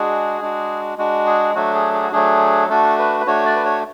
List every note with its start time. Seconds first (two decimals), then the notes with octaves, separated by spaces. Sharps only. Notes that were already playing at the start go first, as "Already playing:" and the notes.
Already playing: G#3 D4 F#4 G#4
0.41 G#3 D4 F#4
0.98 G#3 D4 F#4
1.26 G#4
1.55 F#3 A3 D4 F#4
1.75 G#4
1.94 G#4
2.03 F#4
2.12 F#3 A3 D4 G#4
2.69 A3 D4 F#4 A4
2.99 B4
3.21 B4
3.26 A3 D4 F#4 C#5
3.45 D5
3.56 B4
3.65 C#5